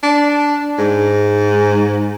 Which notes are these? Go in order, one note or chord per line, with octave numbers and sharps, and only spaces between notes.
D4
G#2